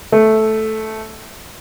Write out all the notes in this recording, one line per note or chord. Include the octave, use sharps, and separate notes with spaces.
A3